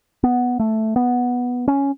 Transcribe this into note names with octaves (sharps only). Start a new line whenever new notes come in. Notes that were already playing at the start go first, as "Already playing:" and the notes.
B3
A3
B3
C#4